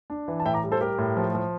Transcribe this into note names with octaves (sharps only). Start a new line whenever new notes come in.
D4
E3
A5
A2 E5 G5
A#5 D6
G3
A4 C5
G3 G4 A#4
A2
F3
F3